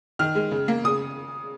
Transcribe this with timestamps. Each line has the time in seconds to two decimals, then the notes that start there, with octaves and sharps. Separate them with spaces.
0.19 D#3 F6
0.35 G#3
0.51 C#3
0.68 A#3
0.84 C#3 D#6